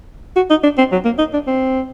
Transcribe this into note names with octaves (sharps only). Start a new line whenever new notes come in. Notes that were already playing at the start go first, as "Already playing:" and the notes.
F#4
D#4
D4
C4
F#3
A#3
D#4
D4
C4